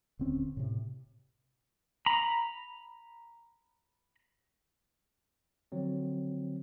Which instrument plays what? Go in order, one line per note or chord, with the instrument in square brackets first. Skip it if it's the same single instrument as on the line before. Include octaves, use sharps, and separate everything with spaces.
[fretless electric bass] D#1 D3 C4 C#4
A2 C3
[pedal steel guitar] A#5 B5
[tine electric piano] D3 F3 F#3 C4